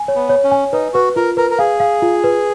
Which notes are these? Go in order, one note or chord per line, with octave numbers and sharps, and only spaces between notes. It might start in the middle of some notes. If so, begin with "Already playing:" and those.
Already playing: G#5
C#5
B3
C#5
C#4
G#5
D#4 B4
F#4 B4
F4 A#4
A#4 B4
A#4
G#4 F5
F5
F4
B4